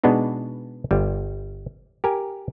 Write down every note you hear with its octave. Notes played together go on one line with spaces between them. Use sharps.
B2 G#3 B3 D4 D#4
G1 G3
G4 A#4 G#5